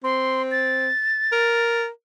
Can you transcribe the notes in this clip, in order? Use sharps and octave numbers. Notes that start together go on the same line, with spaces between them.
C4 C6
A6
A#4